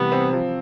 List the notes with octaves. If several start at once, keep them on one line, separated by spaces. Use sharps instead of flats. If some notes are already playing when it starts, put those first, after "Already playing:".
Already playing: C3 E3 G3 B3
C4
F3